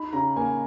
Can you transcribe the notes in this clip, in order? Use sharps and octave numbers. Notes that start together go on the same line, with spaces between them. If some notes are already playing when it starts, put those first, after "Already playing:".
Already playing: D#4 B5
C#3 A#5
A#3 G#5